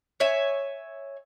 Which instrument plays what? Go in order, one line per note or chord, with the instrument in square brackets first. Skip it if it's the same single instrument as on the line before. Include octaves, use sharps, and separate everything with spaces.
[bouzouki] C#5 E5 G#5